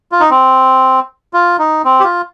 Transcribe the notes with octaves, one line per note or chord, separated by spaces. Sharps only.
F4
D#4
C4
F4
D#4
C4
G4
F4